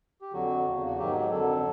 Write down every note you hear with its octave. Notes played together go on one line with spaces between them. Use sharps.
G4
F2 D3 F#3 F#4
E2 C#3 F3
F#4
G#2 D#3 F#3 G4
F2 D3 F#3 A4